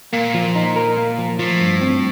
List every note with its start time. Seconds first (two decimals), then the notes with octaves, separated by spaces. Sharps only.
0.13 A#2 A#3
0.34 F3
0.55 D#4
0.76 A#4
0.97 A#3
1.18 F3
1.39 A2 F3
1.61 G2
1.81 C4